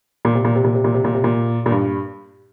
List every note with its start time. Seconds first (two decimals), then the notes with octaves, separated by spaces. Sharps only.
0.25 A#2
0.34 C3
0.45 A#2
0.55 C3
0.64 A#2
0.75 C3
0.84 A#2
0.94 C3
1.05 A#2
1.14 C3
1.24 A#2
1.66 A#2
1.71 G2